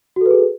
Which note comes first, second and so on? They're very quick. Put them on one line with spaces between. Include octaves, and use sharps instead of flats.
F#4 A4 B4 G#4